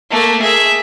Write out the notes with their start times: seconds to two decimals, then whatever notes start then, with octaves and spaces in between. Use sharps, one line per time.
0.11 A3 A#3
0.42 G#4 E5